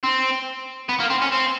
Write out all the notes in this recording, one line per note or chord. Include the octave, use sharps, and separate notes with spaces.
C4
B3
A#3
C4
C#4
C4